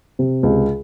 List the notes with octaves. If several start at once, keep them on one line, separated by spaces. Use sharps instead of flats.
C3
C#2